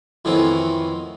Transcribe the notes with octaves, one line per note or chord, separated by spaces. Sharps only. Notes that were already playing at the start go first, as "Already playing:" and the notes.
F2 A2 D#3 E3 B3 C4